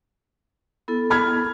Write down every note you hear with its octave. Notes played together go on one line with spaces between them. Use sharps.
B3 E4 A4
B5 F6 G#6